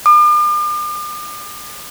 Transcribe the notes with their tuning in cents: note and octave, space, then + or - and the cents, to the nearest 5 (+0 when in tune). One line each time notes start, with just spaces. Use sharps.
D6 +45